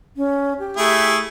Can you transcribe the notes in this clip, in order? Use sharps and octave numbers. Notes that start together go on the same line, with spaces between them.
C#4
G4
A3 E4 G#4